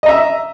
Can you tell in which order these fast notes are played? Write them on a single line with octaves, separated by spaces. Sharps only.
D#5 A#5 E5